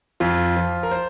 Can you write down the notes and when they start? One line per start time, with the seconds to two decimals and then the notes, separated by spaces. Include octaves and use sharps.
0.20 F2 F4
0.57 F3
0.83 A#4
0.91 C5